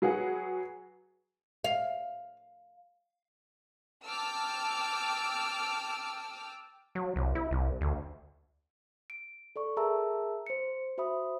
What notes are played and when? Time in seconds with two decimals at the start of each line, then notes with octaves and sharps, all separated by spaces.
0.02 F#3 G#4 B4 F#5
1.64 F5
4.04 G5 A5 D6 E6 F6
6.95 F#3
7.16 C2
7.35 E4
7.51 C2
7.81 D2
9.10 D7
9.56 A4 D5 C#6
9.77 G#4 A#4 E5 A5 A#5 E6
10.46 C5 C#7
10.98 F#4 C5 E5 B5 D#6